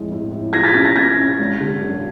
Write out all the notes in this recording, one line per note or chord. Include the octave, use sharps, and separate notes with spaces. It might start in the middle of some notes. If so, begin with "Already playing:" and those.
Already playing: F2 A2 G#3
A2
A2
F3 G#6 A#6
A6 B6
C#4 A6 B6
G#6 A#6
C#4 G#6 A#6
C#4
G#1
D3
F#2